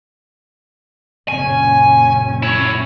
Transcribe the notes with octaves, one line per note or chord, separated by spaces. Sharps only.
F#1 A#2 C#4 G#5
E4 C#5